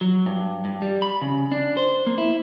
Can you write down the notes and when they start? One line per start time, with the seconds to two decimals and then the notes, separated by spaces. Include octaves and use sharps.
0.01 F#3
0.26 G2
0.65 G2
0.82 G3
1.02 B5
1.22 C#3
1.52 D4
1.77 C5
2.07 A#3
2.18 E4